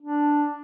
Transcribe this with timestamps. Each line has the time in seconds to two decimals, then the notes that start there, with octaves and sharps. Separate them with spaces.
0.02 D4